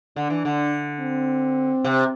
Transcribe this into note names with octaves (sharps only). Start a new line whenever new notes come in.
D3 D4
E3
D3
C4
C3